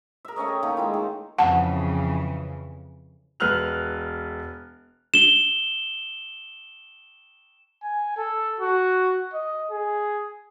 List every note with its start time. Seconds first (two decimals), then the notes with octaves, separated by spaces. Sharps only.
0.25 A#4 E5
0.36 A3 C#4 C#5 D#5
0.48 G4
0.63 D#3 A3 A#3
0.77 G#3 E4 F4
0.94 D#3
1.39 F2 C#3 E3 F#5 A5
3.40 E1 B4 F6 F#6 F7
5.14 E7 G7
7.83 G#5
8.17 A4
8.60 F#4
9.34 D#5
9.71 G#4